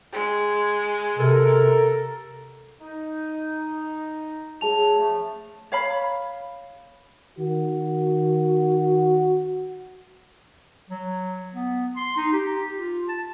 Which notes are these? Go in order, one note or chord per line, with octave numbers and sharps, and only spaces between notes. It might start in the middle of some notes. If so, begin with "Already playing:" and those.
G#3
C3 A4 A#4
D#4
F#3 G#4 A5 F7
C#3 F3 A3
C#5 F5 B5
D#3 F#4
F#3
B3
C6
D#4
G4
F4
A5